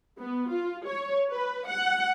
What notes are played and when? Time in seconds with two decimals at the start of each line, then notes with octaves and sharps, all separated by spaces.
0.19 B3
0.50 F4
0.86 C#5
1.32 B4
1.67 F#5